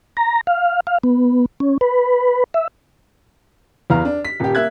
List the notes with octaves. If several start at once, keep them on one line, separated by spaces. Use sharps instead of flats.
A#5
F5
F5
B3
C#4
B4
E5
E2 E3 F5 A#5 F6
D4
B6
D#1 G4
A#3 E5 F#6 G#6